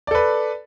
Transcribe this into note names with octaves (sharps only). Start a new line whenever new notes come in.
A4 B4 D5